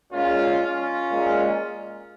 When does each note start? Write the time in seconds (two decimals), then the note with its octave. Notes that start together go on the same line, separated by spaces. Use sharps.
0.12 A#2 G#3 C#4 F4
0.61 C#4 F4
1.10 A#2 G#3